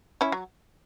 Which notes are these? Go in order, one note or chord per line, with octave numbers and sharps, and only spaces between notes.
C#4 E4
F#3